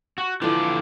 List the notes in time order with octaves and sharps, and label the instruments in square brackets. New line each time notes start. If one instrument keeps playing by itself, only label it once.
[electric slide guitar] F#4
[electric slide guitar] D3 F3 D5 [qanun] E3 F4 A4